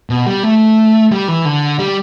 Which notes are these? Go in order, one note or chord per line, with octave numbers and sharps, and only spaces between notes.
B2
G3
A3
G3
E3
D3
G3